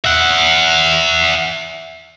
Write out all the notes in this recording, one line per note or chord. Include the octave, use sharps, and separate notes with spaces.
E5 F#5